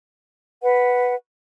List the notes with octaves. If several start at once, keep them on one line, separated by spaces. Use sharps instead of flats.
B4 F#5